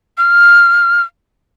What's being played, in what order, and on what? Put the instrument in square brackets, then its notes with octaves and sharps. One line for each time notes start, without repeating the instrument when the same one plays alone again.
[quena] F6